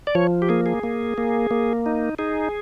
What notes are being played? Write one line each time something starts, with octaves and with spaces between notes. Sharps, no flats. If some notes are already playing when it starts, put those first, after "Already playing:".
D5
F3 C#5
G4
A#3 G#4
G#4
A#3
A#3
A#3
D#4
D#4 G#4